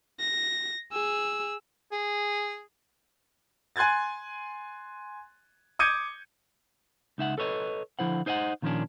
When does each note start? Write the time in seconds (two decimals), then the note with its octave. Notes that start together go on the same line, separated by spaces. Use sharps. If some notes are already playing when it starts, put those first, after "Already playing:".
0.20 A#6
0.92 G#4 E6
1.92 G#4
3.76 G#5 C6 F#6 G#6 A6
5.79 D6 D#6 G6 G#6 C#7 D#7
7.18 C#2 D#4 E5 F#5
7.38 A4 B4 C#5 D#5
7.99 D3 F3 E4 C5 F#5
8.26 D#4 C5 D#5 E5 F#5
8.62 A#2 D#3 F3 A#3 C#4 D4